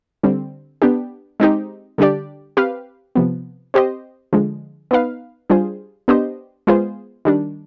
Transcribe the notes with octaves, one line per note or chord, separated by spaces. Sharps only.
D3 G3 C4
B3 D4 G4
G#3 C4 D#4 G4
D3 G3 D4 G4 D5
C4 G4 B4 F5
C3 F3 B3
C4 G4 C5 D#5
D3 F3 G#3
B3 D#4 B4 F5
G3 D4 F4 G#4 C5
B3 D4 G4 C5 D#5
G#3 B3 F4 G#4 C5
D#3 G3 D4